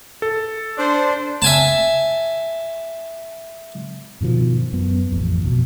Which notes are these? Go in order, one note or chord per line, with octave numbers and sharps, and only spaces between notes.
A4
D4 C5
E5 G#5 A5
G2 B2 D#3 F3
F#2 B3
A1 F2
F2 B2